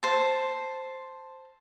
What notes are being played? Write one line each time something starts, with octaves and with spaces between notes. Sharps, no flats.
C5 A5